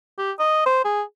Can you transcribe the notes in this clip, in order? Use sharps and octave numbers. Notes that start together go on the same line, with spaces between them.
G4
D#5
C5
G#4